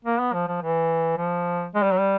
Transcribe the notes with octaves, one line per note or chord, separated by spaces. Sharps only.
A#3
B3
F3
F3
E3
F3
G#3
G3
F#3
G3